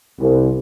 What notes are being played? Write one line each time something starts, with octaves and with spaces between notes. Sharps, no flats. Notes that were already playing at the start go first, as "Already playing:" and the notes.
C2